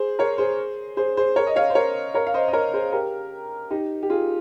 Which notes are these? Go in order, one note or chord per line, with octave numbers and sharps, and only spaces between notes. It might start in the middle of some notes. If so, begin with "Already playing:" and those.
Already playing: G#4 C5
A#4 C#5
G#4 C5
G#4 C5
G#4 C5
A#4 C#5
D#5
C#5 F5
C5
A#4 C#5
A#4 C#5
F5
C5 D#5
D#5
A#4 C#5
G#4 C5
G4 A#4
D#4 G4
G4
F4 G#4